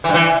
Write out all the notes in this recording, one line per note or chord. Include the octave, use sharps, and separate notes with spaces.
E3
G2
E3